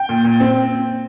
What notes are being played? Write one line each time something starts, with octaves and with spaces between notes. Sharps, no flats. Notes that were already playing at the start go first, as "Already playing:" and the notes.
Already playing: G5
A#2
A#2
C4